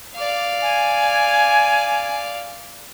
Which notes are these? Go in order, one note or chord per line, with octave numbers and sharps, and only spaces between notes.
D5 F5
G#5